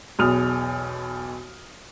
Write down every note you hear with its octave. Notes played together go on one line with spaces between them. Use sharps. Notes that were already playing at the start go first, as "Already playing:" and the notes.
B1 E2 B2 D#6 F6 F7